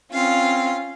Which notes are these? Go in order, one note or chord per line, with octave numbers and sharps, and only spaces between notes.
C4 C#4 F4 F5